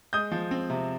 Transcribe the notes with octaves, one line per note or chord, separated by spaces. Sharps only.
G#3 D#6 G6
F3
C4
C3